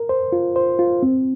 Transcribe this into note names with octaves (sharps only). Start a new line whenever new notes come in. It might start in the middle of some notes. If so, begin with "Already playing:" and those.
Already playing: A#4
C5
F4
C5
F4
C4